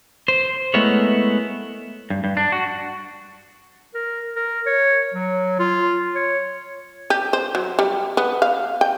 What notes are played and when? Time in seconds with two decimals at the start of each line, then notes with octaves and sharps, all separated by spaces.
0.28 C5
0.74 G#3 A3 B3 E4 A#4 C#5
2.10 G2
2.24 G2
2.37 D4
2.52 F#4
3.95 A#4
4.36 A#4
4.66 C#5
5.14 F#3
5.59 F4
6.15 C#5
7.10 G4
7.33 C5
7.55 F#3
7.79 G3
8.17 B3
8.42 F5
8.81 G5